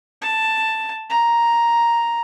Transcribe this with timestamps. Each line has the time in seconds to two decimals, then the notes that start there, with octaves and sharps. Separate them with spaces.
0.22 A5
1.10 A#5